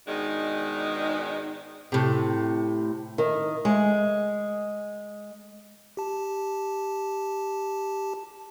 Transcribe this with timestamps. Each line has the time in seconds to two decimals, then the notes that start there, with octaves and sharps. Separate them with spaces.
0.07 G#2 B2 D#3 G#3 D4 D#4
1.92 A2 C3
3.18 D#3
3.65 G#3
5.97 G4 A5